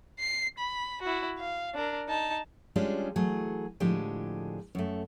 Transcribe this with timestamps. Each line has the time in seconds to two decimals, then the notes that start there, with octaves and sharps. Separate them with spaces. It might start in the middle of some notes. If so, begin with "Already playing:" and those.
0.20 C7
0.58 B5
1.02 E4 F#4
1.39 F5
1.74 D4 A#4
2.08 D#4 A5
2.76 G3 G#3 C#4 D4 F4 G#4
3.16 E3 F#3 A3 G#4
3.80 A2 D3 F3 G#3 G4 G#4
4.75 F#2 A3